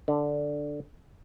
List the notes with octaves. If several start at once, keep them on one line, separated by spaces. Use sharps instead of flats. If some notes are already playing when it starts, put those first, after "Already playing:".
D3